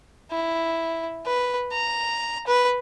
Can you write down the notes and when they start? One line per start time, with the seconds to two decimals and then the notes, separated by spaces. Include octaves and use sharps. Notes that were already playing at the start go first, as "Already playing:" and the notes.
0.32 E4
1.26 B4
1.72 A#5
2.47 B4